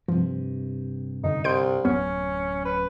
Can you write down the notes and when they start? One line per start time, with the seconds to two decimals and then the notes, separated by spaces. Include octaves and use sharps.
0.08 G2 C3 F3
1.24 F#2 D3 D#4
1.44 C2 C6 G6 D7
1.85 D1 F#2 B3 C#4
2.65 B4